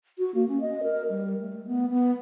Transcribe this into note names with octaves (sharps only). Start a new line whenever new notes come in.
F#4
A#3
C#4
D#5
A#4
G3
A3
B3
B3